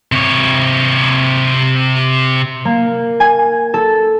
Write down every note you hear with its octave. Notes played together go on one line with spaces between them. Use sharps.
C3 C#5
A#3
G#5
A4